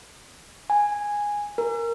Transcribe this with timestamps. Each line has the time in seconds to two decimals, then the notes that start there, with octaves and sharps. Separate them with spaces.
0.70 G#5
1.58 A#4